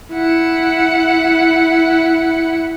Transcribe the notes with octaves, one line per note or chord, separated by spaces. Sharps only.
E4 F#5